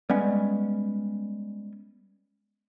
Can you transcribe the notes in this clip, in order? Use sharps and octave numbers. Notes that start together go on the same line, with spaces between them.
G3 G#3 B3 C#4